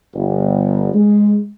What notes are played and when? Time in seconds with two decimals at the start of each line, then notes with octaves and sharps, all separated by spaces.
0.14 G1
0.94 G#3